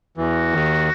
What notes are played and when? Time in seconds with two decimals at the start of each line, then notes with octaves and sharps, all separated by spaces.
0.18 E2 E3 F#4
0.53 D#2 D#3